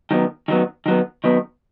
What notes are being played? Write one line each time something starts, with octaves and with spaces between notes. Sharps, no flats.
D#3 F#3 B3
D#3 F#3 B3
D#3 F#3 B3
D#3 F#3 B3